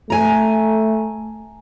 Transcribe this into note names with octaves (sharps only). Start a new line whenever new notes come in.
A3 G#5 A#5